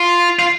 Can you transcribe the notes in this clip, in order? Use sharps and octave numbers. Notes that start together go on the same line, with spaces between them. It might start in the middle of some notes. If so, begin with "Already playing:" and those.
Already playing: F4
F4